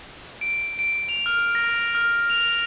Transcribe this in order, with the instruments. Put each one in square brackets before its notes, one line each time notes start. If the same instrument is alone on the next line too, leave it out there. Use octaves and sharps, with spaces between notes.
[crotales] D7
D7
F7
F6
A#6
F6
F7